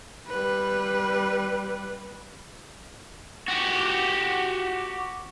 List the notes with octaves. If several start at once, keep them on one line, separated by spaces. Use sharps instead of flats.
G3 B4
F#4 G4